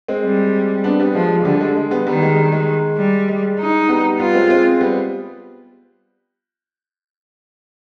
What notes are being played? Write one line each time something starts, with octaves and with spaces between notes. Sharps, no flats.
G#3 C4
G3
B3 D4
G3 B3
F3 G#3
D3 G3
G#3
G#3
G3 B3
D#3 G3 B3
G#3
G3
G#3
G3
G#3
D#4
G3 B3
G3 B3 F4
G#3 C4
G#3 C4
G3 B3